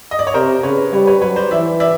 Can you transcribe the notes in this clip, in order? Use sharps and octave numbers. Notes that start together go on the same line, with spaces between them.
D#5
D5
C#5
C3 A#4 C5
C#3 B4 C#5
G3 B4 C#5
B4 C#5
F#3 B4 C#5
C5 D5
E3 D5 E5
D5 E5